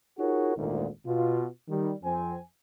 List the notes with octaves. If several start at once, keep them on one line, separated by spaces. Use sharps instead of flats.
D#4 F4 F#4 G#4 A#4 C#5
G#1 D2 A#2
B2 F4
D#3 G3
F2 C4 G#5